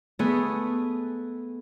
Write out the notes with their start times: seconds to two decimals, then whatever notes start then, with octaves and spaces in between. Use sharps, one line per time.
0.19 A3 B3 G#4